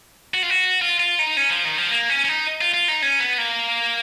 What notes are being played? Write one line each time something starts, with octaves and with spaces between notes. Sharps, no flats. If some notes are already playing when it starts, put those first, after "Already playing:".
F#4
F4
F#4
F4
F4
D#4
C#4
F3
D#3
F3
A#3
C#4
C#4
D#4
F4
F4
D#4
C#4
B3
A#3